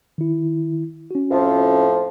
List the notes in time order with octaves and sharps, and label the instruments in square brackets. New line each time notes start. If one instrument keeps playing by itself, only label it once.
[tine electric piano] D#3 E4
C#4 F#4
[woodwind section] F2 A2 F3